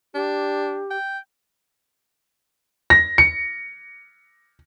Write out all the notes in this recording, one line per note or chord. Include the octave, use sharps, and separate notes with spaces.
D4 G4
G5
A#6
C#7